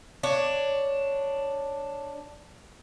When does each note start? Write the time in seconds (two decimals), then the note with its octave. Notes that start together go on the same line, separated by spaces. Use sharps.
0.23 D4 C#5